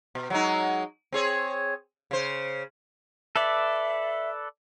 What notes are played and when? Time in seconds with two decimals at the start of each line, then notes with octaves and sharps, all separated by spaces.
0.15 B2
0.30 F#3 G#3 D#4
1.12 C4 G#4 C#5
2.11 C#3 C5
3.36 A4 B4 D5 E5